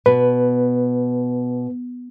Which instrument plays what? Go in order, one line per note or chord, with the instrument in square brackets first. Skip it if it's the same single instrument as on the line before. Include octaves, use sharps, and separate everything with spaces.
[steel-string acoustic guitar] B2 [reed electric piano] B4